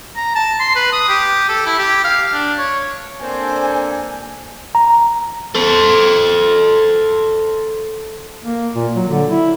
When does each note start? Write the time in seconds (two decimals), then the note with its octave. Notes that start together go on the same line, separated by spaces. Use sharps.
0.16 A#5
0.35 A5
0.60 C6
0.76 B4
0.92 D#6
1.09 G4
1.49 A4
1.66 E4
1.79 G4
2.04 F5
2.33 D4
2.58 C#5
3.21 A#3 C4 D4 A4 C5 G#5
4.75 A#5
5.55 A4 C5
8.44 A#3
8.74 A#2
8.95 F#3
9.10 D3
9.30 E4